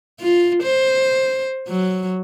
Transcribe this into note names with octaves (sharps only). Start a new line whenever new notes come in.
F4
C5
F#3